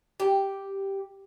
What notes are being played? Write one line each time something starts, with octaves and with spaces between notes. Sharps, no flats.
G4